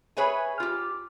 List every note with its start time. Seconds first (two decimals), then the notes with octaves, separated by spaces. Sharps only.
0.17 G#4 B4 C#5 E5 G#5
0.60 F4 G4